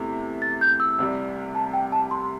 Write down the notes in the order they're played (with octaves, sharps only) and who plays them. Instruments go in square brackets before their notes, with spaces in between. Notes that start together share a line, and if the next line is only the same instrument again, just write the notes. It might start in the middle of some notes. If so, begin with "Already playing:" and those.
Already playing: [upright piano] E2 C3 A3 E4
[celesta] A6
G6
E6
[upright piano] C2 C3 G3
[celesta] A5
G5
A5
C6